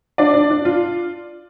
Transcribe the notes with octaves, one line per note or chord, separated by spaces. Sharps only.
D4 D5
D4
D4
F4